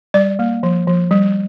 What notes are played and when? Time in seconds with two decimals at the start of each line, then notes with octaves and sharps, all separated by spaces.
0.14 G3 D5
0.39 A#3
0.63 F3
0.87 F3
1.11 G3